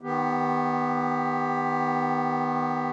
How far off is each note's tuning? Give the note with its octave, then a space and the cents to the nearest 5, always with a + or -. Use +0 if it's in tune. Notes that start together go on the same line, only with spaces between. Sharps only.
D#3 +0 B3 +0 G4 +15